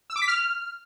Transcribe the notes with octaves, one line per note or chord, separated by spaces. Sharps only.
E6
D6
B6
F6